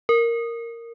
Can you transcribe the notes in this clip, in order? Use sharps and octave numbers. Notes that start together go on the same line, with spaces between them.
A#4